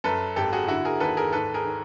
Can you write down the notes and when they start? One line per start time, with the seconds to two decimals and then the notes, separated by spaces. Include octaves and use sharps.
0.04 F#2 A4 B4
0.36 G#1 G4 A4
0.53 F#4 G#4
0.68 D3 E4 F#4
0.85 G#4 A#4
1.00 D#2 A4 B4
1.17 G#4 A#4
1.32 G#2 A4 B4
1.54 G#4 A#4
1.65 D#3